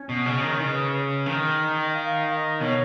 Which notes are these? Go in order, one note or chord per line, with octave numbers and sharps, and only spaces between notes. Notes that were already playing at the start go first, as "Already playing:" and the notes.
Already playing: C#4
B2
C#3
D#3
C#5
C#3 B4
D#3 D#5
F5
D#5
B2 C#5